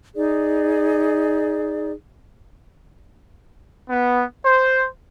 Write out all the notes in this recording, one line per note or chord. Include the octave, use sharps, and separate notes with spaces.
D#4 G#4 D5
B3
C5